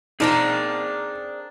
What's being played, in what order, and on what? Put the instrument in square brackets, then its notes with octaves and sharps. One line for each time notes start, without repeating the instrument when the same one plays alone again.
[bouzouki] C4 D4 A#4 [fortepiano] D#4 [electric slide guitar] G#4 D5 A5